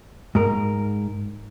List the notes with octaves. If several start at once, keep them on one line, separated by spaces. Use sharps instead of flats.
G#2 A#4